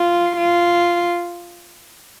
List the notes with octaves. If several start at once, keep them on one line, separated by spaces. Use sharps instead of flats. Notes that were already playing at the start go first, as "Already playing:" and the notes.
Already playing: F4
F4